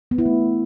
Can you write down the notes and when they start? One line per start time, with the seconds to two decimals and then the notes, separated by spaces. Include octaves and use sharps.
0.11 B3
0.18 E4
0.26 A3